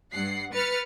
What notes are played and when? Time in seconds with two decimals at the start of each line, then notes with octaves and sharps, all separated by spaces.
0.13 G2 F#5 C7
0.54 B4 F6 A6 C#7